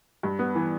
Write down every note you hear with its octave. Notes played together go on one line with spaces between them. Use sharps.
G2
B3
E3